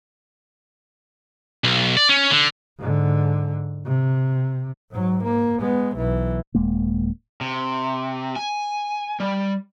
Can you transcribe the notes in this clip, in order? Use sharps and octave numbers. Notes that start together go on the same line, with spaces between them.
B1
D5
C#4
D3
G#2 D3
C3
G#2 F#3
A#3
G#3 B3
B1 E3
D#1 G#3 A#3
C3
G#5
G3